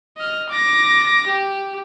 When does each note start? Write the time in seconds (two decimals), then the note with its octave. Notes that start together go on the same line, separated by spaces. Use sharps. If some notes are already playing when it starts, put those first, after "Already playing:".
0.17 D#5 F6
0.49 D6 A#6
1.27 G4